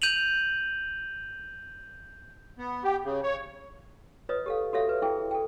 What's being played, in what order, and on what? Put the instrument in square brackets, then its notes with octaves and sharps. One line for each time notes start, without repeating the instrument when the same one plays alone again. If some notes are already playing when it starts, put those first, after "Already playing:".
[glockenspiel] G6 D#7 F7 F#7
[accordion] B3
G4
C#3
C#5
[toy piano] F4 B4 C#5 D#5 D#6
G4 A4 F5
F#4 G4 A4 C#5 E5 F5
B4
E4 G#4 A4 G5
A4 G5